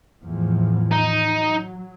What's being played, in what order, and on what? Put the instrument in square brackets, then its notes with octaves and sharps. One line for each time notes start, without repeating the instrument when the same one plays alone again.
[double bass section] E2 A2 F3
[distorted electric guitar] D#4
[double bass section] F#3